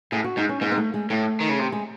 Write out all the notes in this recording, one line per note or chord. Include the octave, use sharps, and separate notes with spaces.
A2 G#4
F#4
G#2 D#4
C#4
G#2 C4
C4
A3
G#3
A2 A3
D#3
C#3
C3
G#3